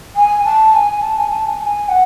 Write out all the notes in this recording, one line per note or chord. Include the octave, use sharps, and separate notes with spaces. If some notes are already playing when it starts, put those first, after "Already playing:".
G#5
A5
G#5
A5
G#5
A5
G#5
A5
G#5
F#5